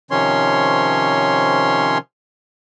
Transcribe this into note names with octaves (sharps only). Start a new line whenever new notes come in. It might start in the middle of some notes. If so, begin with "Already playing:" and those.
C3 D#3 F3 C#4 C#5 C6